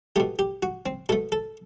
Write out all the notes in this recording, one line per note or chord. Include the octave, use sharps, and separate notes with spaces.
B2 A3 G4
G4
F#4
C4
B2 A3 A4
A4